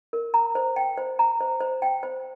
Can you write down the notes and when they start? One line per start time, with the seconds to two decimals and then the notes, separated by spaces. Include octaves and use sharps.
0.13 A#4
0.34 A#5
0.55 C5
0.76 G5
0.98 C5
1.19 A#5
1.41 C5
1.60 C5
1.82 G5
2.03 C5